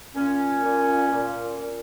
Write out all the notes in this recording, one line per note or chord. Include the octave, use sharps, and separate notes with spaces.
A#2 C#4
A#2
A#2
A#2